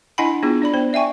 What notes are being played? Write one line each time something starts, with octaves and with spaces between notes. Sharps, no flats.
D4 E4 D#5 F#5 G#5 B5
B3 D4 E4 F4 G#4
D4 D5 B5
B3 C5
D5 E5 G5 G#5 C#6